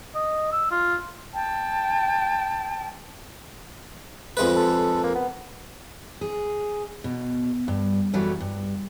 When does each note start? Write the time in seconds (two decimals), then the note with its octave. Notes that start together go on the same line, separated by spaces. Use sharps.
0.15 D#5
0.52 E6
0.71 F4
1.34 G5 A5
4.37 F2 G#3 B4
4.57 A4
5.04 A#3
5.16 B3
6.21 G#4
7.04 B2
7.68 G2
8.14 F#2 E3 F#3 G3 A3
8.40 G2